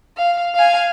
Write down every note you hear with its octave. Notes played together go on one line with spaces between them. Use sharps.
F5
F5 G#5